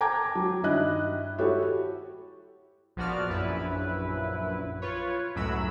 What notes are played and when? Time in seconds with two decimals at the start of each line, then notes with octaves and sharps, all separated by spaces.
0.01 G5 A5 A#5 D6 G#6
0.35 F#3
0.63 G2 D#3 E4 D#5 F#6
1.38 E4 F#4 G4 A4 C#5
2.96 A#1 F3 B3 F#4 D5 F6
3.28 A#1 F#2 E4 B4
4.82 F4 B4 C#5
5.35 C#2 F#2 A2 F#3 B5 E6